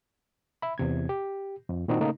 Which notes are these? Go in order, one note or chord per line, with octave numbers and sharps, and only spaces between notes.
E5 B5
E2 C3 G#6
G4
F2
A#2 D#3 C4 D4 D#4 F#4
C#3 A3 A#3 D#4